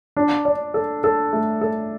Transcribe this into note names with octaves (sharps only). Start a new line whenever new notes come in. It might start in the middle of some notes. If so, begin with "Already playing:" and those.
D4
D5
A4
A4
A3
A4